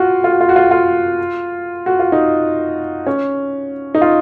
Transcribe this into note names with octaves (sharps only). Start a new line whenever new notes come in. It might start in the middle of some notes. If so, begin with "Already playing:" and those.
Already playing: F4 F#4
F4
F#4
F4
F#4
F4
F4
F#4
F4
D#4
C#4
D#4
F4